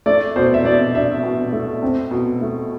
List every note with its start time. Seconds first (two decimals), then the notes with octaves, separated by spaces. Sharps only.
0.06 A3 D5
0.36 B2 C5
0.54 E5
0.65 B2 D5
0.94 D4 E5
1.24 B2
1.52 A3
1.83 C4
2.11 B2
2.41 A3